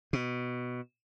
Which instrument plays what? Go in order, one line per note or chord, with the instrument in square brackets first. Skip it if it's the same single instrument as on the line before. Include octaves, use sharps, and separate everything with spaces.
[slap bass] B2